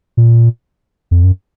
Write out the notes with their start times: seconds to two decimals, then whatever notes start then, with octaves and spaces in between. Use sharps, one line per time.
0.17 A#2
1.11 F2
1.24 F#2